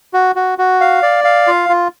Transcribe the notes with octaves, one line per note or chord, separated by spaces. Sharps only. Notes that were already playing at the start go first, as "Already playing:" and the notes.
F#4
F#4
F#4
F5
D5
F5
F4
F4